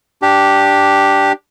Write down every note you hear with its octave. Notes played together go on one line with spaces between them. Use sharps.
D4 G4